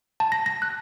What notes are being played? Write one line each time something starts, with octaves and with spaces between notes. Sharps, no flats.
A5
A#6
A#6
F#6